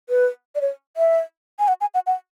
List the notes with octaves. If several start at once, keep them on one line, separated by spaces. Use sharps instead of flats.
B4
D5
C#5
E5
G#5
F#5
G#5
F#5
F#5